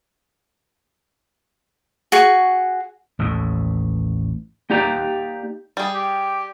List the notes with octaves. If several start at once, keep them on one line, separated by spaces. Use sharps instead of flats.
F#4 G#4 C#6
A1 D#2 A2
A#3 D#4 G4 D5 A#5
G3 G#4
G4